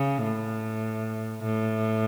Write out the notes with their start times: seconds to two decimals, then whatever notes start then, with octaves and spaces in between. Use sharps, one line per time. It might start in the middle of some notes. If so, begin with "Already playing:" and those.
Already playing: C#3
0.23 A2
1.43 A2